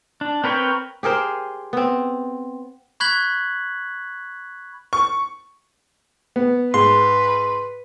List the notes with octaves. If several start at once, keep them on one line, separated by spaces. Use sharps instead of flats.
D4
C4 A#4 B4 C#5 G5
G4 G#4 A#4 C5
B3 C4
B5 C#6 F#6 G#6 B6 F#7
C#6
B3
G#2 B4 C6